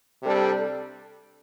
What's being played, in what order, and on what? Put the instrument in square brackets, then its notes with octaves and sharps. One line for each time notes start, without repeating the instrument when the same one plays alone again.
[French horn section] C3 G3 D4 A4